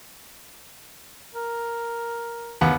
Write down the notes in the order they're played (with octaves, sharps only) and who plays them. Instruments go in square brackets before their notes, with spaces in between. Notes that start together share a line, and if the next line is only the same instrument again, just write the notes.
[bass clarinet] A#4
[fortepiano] D#2 B3